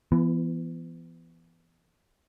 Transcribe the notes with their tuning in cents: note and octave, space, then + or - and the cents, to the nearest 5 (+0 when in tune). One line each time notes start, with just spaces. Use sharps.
E3 +35 B3 +0